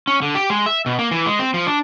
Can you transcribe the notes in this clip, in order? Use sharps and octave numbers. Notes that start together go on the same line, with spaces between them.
C#4
D3
G4
G#3
E5
B2
A#3
E3
G#3
C4
F3
D4